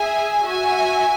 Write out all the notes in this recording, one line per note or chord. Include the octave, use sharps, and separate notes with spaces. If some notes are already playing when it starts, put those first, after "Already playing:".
Already playing: G#4 E5 G#5
F#4 E5 G#5